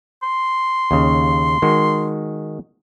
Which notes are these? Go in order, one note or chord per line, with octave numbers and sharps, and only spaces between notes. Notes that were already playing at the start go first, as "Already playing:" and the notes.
C6
D#2 C#3
D#3 G#3 F#4